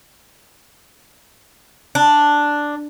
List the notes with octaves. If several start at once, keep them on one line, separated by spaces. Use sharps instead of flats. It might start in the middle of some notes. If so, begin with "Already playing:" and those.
D4